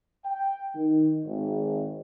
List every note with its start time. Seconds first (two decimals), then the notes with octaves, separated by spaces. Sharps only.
0.25 G5
0.75 D#3
1.25 G#1